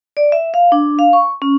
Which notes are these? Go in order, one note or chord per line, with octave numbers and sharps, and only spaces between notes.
D5
E5
F5
D4
F5
C#6
C#4